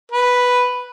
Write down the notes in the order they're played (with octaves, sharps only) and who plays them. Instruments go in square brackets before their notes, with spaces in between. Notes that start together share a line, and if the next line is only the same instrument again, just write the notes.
[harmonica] B4